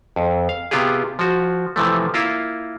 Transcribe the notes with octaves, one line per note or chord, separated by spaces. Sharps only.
F2
F5
C3 B3 F4 G4 G#4
F3 F#4
C3 E3 F3 A3
A#3 E4 F4